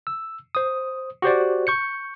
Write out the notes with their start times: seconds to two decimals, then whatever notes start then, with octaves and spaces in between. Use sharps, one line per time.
0.07 E6
0.55 C5 D#6
1.22 F#4 G4 C5 D5
1.67 C#6 G6 C#7